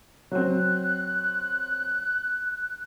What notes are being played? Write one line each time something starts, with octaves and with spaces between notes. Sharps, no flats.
F#3 C4 F#6